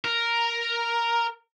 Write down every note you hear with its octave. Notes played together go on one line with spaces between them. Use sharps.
A#4